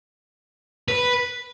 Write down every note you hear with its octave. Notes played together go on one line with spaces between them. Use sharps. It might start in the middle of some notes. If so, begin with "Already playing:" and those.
B4